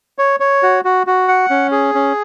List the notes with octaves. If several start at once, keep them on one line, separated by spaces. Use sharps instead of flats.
C#5
C#5
F#4
F#4
F#4
F#5
C#4
G#4
C#4